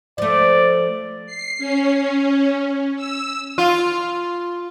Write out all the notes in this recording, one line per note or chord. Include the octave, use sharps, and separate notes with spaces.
F3 A3 D5
C7
C#4
E6
F4